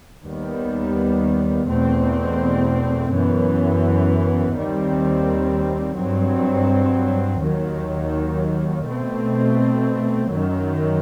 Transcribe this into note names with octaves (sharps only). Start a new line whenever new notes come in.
D#2 D#3 G3 B3
E2 B2 A3 C4
F#2 E3 B3
D#2 D#3 G3 C4
G2 F#3 C4
D#2 D#3 F#3
B2 A3 C4
F#2 D#3 F#3